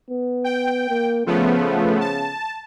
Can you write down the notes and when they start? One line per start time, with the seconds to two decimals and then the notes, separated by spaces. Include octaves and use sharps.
0.10 B3
0.44 G5
0.89 A#3
1.27 C#3 F3 A3 B3
2.00 A5